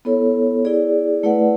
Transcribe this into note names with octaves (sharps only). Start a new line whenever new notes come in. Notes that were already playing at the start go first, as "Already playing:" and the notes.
B3 E4 A4 C#5
E4 G#4 D5
A3 E4 B4 D5 F#5